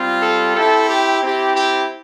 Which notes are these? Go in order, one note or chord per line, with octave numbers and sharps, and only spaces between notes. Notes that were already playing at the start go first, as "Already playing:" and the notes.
Already playing: G3 C4 F4
A4
C4 E4 G4 A4
G4
C4 E4 G4
G4